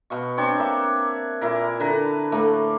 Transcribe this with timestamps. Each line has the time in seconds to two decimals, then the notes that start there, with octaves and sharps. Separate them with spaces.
0.10 B2 F5 C#6
0.37 C4 D4 C#5
0.59 A#3 E5
1.41 A#2 E4 A#4
1.80 D3 B4 A#5
2.32 A2 A3 A#3